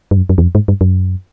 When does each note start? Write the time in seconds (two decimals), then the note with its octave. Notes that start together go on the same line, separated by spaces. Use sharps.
0.11 G2
0.17 F#2
0.29 F#2
0.38 E2
0.42 F2
0.55 G#2
0.68 G2
0.81 F#2